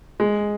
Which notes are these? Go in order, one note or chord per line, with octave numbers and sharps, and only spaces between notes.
G#3